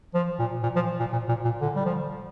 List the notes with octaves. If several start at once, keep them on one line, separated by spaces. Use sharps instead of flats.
F3
A#2
A#2
F3
A#2
A#2
A#2
A#2
D3
G3
F3